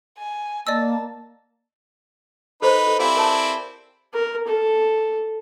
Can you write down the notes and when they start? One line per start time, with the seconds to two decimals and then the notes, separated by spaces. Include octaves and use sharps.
0.18 G#5
0.67 A#3 D5 D#5 A5 E6
2.62 D#4 A4 B4 C5 C#6
2.87 A4
2.99 C4 E4 G4 D5 F5 G#5
3.16 A#4 C#5 A5
4.14 A#4
4.47 A4